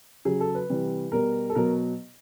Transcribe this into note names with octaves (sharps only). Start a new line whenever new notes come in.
C#3 F#3 G#4
A4
B4
C3 E3 G3
B2 G3 A#4
A4
B2 F#3 A#4